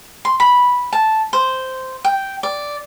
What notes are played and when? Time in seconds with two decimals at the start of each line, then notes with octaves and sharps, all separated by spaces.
0.25 C6
0.40 B5
0.93 A5
1.33 C5
2.04 G5
2.43 D5